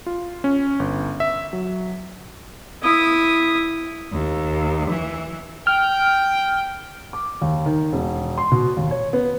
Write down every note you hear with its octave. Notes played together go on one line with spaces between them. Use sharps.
F4
C#4
G1
E5
F#3
E4 D#6
D#2
E3
G5 F6
D6
D#2
D#3
E1
C6
B2
D#2
C#5
B3